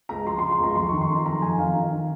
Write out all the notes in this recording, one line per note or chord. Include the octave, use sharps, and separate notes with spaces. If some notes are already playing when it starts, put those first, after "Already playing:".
C#2 A#5
F3 C6
C#3 C6
C6
C#2 A#5
F2 C6
D#3 C#6
C6
D#3 A#5
F2 A#5
F2 G#5
D#3 F5
D#3
D#3